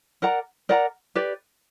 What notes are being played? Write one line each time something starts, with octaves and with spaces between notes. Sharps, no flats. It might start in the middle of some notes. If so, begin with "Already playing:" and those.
A#4 D5 F#5 A#5
A#4 D5 F#5 A#5
G4 B4 D5